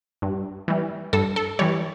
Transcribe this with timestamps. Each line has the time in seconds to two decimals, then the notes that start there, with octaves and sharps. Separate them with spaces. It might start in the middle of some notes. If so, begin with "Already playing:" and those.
0.22 G2
0.68 E3 G3
1.13 G2 A4
1.36 A4
1.59 E3 G3 C#5